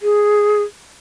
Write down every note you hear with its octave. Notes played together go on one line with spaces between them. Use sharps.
G#4